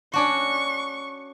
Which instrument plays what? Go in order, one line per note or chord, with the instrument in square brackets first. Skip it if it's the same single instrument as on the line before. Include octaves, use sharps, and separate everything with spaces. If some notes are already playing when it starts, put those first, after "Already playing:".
[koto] C#4 D4 F#4 [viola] C#6